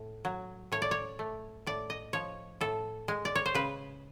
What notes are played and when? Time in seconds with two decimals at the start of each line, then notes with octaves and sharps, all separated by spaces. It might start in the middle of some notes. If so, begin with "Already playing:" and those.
Already playing: A2
0.25 F#3
0.72 A2 C#5
0.82 D5
0.91 C#5
1.19 A3
1.66 A2 D5
1.90 D#5
2.13 F3 C#5
2.61 A2 A4
3.08 G#3
3.25 D5
3.35 C#5
3.46 C5
3.54 C#3 B4